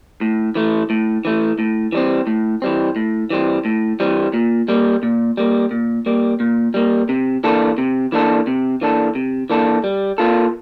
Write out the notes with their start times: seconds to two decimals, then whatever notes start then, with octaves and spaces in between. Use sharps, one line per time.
0.21 A2
0.55 E3 A3
0.90 A2
1.25 E3 A3
1.59 A2
1.92 E3 G3 C4
2.27 A2
2.62 E3 G3 C4
2.96 A2
3.30 E3 G3 C4
3.65 A2
4.00 E3 G3 C4
4.34 A#2
4.68 G3 A#3
5.03 A#2
5.37 G3 A#3
5.71 A#2
6.06 G3 A#3
6.40 A#2
6.74 G3 A#3
7.09 C3
7.44 E3 A#3 D4 A4
7.78 C3
8.12 E3 A#3 D4 A4
8.47 C3
8.81 E3 A#3 D4 A4
9.15 C3
9.50 E3 A#3 D4 A4
9.84 G3
10.18 A#3 F4 A4